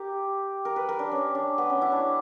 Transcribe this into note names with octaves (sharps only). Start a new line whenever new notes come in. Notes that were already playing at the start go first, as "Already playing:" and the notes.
Already playing: G4 A#4
A#4
B4
A#4
D4
C#4
D4
B3
C#4
E4
D4